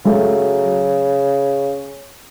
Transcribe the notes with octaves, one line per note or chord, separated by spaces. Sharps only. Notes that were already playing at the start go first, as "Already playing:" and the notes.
C#3 F#3 A3